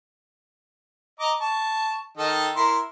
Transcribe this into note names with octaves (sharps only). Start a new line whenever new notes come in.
D#5 A#5 D6
A5 C#6
D#3 A4 D#5
E4 A#4 C6